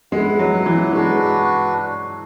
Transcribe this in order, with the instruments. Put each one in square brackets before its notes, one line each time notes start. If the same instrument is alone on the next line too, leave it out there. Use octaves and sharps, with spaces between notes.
[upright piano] G#3 [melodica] E4 B4 F#5
[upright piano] F#3
E3
[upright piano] G#3 [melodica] D4 F#4 B4